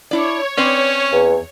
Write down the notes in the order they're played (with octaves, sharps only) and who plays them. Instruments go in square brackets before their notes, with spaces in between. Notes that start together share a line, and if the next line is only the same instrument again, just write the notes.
[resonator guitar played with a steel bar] D4 E4 D5 [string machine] C#5
[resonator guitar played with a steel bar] C4 B4 D5 [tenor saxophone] C#4
[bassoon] E2